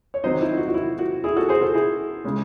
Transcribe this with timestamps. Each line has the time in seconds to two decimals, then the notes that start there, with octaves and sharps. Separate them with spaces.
0.14 C#5
0.24 D#3 F#3 C4 D#4 C5 D#5
0.41 E4
0.57 F#4
0.68 F#4
0.74 E4
0.99 F#4
1.24 E4 G#4
1.36 F#4 A4
1.49 G#4 C5
1.61 F#4 A4
1.75 E4 G#4
2.25 C#3 G#3 C#4